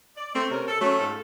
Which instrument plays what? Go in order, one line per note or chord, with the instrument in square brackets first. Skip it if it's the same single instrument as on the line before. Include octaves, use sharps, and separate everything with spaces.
[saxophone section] D5
[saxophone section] A3 [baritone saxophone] C4
[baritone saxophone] C3 [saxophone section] C#4 A#4
[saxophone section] A4
[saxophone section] F#3 C#4 [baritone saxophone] A3
[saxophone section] G#2 F4 A4